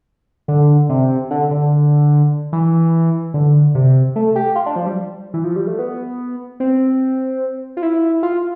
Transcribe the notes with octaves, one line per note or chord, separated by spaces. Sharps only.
D3
C3
D3
D3
E3
D3
C3
A3
G4
F4
D4
F3
G3
E3
F3
G3
A3
B3
C4
F4
E4
F4